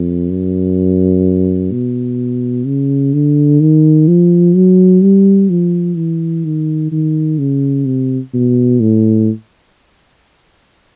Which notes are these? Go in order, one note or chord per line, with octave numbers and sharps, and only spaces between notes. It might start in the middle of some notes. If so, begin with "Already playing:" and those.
Already playing: F2
F#2
B2
C#3
D3
D#3
F3
F#3
G3
F3
E3
D#3
D#3
C#3
C3
B2
A2